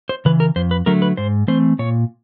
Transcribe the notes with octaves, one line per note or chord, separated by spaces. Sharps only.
C5
C#3 E3 B4
A#4
F2 C5
B4
D3 F#3 A3 A#4
B4
G#2 C5
E3 A3 C4 C5
A#2 C#5